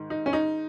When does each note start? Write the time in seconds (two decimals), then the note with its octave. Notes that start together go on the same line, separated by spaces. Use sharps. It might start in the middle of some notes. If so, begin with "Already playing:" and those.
Already playing: G#2 D#3
0.10 D#4
0.26 C#4
0.33 D#4